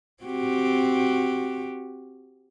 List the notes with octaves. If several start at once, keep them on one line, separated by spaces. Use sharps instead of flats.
C4 F#4 G4